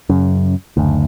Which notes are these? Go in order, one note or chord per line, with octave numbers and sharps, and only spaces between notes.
F#2 C#3
F#1 D2